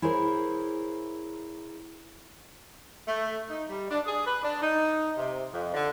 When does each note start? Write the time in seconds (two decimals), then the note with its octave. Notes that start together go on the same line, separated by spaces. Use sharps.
0.02 E4 G#4 A#4 C5 C#5
3.07 A3
3.48 D#4
3.68 G3
3.90 D4
4.05 G#4
4.25 B4
4.43 D4
4.61 D#4
5.16 C3
5.54 F2
5.73 D3